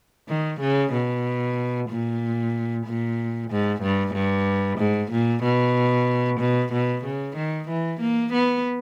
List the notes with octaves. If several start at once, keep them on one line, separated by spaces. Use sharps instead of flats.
D#3
C#3
B2
A#2
A#2
G#2
G2
G2
G#2
A#2
B2
B2
B2
C#3
D#3
E3
A#3
B3